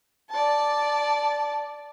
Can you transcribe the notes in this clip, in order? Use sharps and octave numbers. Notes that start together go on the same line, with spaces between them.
D5 A5